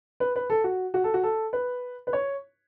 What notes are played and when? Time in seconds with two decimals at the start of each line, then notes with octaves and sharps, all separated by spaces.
0.20 B4
0.36 B4
0.50 A4
0.64 F#4
0.94 F#4
1.04 A4
1.14 F#4
1.23 A4
1.53 B4
2.07 B4
2.13 C#5